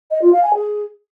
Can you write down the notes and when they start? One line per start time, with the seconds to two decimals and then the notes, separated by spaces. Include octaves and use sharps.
0.11 D#5
0.22 F4
0.32 F5
0.43 G#5
0.54 G#4